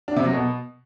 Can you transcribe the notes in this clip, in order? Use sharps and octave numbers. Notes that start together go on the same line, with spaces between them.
D4
C3
F#3
B2